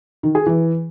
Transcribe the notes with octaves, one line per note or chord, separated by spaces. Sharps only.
D#3
G#4
E3